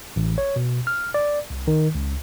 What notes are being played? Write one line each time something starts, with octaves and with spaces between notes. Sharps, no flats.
A1
C#5
B2
F6
D5
C2
D#3
C#2